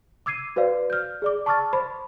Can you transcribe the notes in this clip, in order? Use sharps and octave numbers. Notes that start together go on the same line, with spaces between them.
D6 E6 G#6 C7 D#7
F#4 B4 C5 D5 F5
F6 G6
G#4 D5 D6
A5 C#6 D6 E6 F6 A6
C5 B5